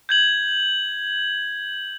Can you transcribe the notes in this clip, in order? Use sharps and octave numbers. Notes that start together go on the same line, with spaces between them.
G6 G#6 F#7